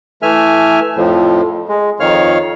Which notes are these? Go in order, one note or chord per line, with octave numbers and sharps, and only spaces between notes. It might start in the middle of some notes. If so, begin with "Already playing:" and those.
E3 A3 E5 G#5 F6
F2 A2 F3
G#3
F2 D#3 C#5 F5 F6